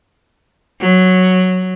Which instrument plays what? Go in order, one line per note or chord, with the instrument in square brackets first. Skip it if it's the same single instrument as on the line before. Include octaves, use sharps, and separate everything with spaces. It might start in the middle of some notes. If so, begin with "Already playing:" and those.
[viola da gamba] F#3